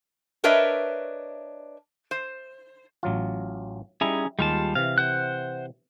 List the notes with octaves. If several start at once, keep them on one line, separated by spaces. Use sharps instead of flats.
D4 A#4 B4 C#5 D#5 E5
C5
A1 F#3 F4
G3 C#4 D#4 E4 G#4 A#5
D#2 G3 G#3 F4 A5
C3 E3 F5
C5 F#5 F#6